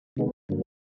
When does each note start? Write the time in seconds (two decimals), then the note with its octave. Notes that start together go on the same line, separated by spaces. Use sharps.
0.17 C3 D#3 G#3 B3
0.49 G2 D3 F#3 A#3